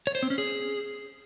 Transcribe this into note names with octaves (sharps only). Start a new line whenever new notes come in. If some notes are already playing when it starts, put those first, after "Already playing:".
C#5
C5
C4
C#4
G#4